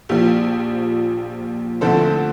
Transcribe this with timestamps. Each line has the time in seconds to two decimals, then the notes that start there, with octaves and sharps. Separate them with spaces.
0.09 A#1 A#2 F3 G4
1.81 D2 D3 F3 A3 C4 A4 C5